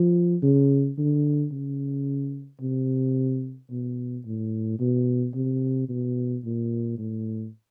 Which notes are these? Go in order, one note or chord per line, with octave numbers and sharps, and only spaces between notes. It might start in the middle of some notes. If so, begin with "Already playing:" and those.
Already playing: F3
C#3
D3
C#3
C3
B2
A2
B2
C3
B2
A#2
A2